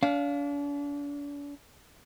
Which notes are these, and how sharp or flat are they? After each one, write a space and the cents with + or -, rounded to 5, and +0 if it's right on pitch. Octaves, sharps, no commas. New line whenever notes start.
D4 -40 F5 +0